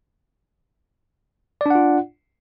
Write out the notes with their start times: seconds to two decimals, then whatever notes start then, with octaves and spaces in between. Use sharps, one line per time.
1.61 D5
1.66 D4
1.70 F#5
1.75 F4